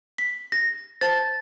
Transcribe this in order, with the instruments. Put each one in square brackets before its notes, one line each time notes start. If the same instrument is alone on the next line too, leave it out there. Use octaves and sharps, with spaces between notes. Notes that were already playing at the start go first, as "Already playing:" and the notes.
[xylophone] B6
[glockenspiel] A#6
[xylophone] C5 A5 [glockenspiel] A6